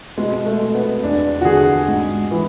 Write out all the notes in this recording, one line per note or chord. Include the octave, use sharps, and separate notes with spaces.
B2 G#3
A3
B2
B3
E2 D4
F#4
D3 G#4
G#2
E3